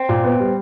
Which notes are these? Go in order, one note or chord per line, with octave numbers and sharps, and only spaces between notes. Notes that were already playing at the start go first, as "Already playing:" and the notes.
Already playing: C4
A#2
B3
G3